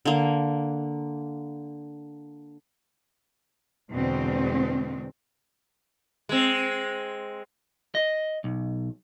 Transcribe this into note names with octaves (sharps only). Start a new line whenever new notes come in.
D3 A#3
E2 B2 D3 G#3 C4
G#3 C4
D#5
B1